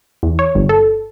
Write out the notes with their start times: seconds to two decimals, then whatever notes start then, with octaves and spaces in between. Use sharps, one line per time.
0.23 E2
0.39 C#5
0.55 G1
0.69 A4